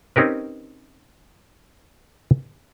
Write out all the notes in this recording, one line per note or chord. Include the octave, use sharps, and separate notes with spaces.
C4 C#4 D#4 G4 A#4 B4